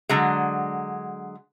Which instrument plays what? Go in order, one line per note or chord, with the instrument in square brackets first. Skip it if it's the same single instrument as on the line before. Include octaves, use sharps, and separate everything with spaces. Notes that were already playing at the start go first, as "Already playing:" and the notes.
[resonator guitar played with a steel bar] D3 F#3 G#3